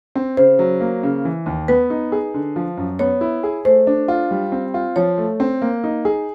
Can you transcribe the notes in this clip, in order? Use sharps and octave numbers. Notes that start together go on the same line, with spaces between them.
C4
C#3 C5
F#3
A#3
C#3
E3
D#2
B3 B4
D#4
G#4
D3
F3
F#2
B3 C#5
E4
G#4
A3 C5
D4
F4
G3
C4
F4
F3 C#5
A3
C4
A#3
D#4
G#4